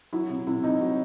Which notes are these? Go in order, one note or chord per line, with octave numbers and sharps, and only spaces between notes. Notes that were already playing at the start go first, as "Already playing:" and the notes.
F#3 E4
C3
C3 E4
C4 D#4
F#3